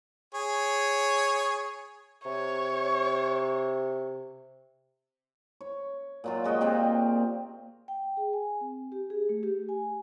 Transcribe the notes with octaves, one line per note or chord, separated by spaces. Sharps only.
G#4 C#5
C3 C#5
C#5
A#2 F#3 F4
G#3 F#4 D#5 G5
A#2 C4 F4 G4
G5
G#4
G#5
C4
G4
G#4
A3
G4
G#5